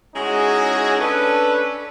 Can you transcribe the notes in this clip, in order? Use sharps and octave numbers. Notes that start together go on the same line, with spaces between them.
G#3 C#4 D#4 E4 F#4 G#4
C#4 D4 A4 B4